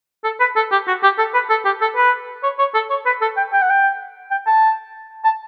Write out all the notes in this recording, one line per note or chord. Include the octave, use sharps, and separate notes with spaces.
A4
B4
A4
G4
F#4
G4
A4
B4
A4
G4
A4
B4
C#5
C#5
A4
C#5
B4
A4
G5
G5
F#5
G5
G5
A5
A5